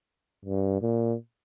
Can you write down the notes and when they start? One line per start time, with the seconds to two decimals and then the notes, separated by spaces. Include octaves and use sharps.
0.45 G2
0.82 A#2